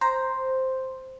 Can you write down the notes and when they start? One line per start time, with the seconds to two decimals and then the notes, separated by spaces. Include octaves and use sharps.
0.01 C5 A#5